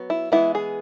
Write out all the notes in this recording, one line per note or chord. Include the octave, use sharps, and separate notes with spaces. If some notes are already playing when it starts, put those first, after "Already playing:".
Already playing: F#3 B3
E4
E3 G#3 B3 E4
G#4